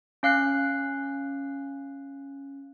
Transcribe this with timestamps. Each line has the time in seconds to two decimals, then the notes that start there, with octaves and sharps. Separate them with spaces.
0.23 C#4 F5 F#6 C7